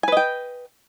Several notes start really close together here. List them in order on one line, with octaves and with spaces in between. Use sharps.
G#5 B4 D#5 G5